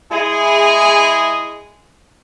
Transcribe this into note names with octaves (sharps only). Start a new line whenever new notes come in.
G#3 E4 G#4